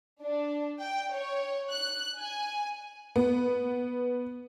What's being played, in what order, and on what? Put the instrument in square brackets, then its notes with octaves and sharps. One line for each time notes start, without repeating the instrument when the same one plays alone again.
[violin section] D4
G5
C#5
F#6
G#5
[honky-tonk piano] B3